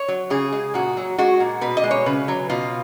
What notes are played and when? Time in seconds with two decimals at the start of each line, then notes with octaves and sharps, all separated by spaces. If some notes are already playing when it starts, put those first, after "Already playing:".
Already playing: C#5
0.08 F#3
0.30 C#3 G#4
0.52 G#3
0.74 A#2 F#4
0.97 F#3
1.18 G#3 F#4
1.40 A#2
1.61 B2 B4
1.77 D#5
1.83 G#3
1.91 C#5
2.06 C#3 B4
2.28 F#3
2.50 B2 F4